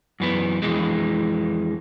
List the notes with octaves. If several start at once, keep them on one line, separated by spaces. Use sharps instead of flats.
F#2 E3 B3
F2 E3 G#3